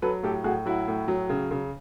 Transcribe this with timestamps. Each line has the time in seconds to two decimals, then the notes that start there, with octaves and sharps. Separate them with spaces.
0.02 F#3 A4 B4
0.23 A2 G4 A4
0.44 A2 F#4 G#4
0.65 F#3 E4 F#4
0.88 A2
1.08 F#3
1.29 C#3
1.51 C#3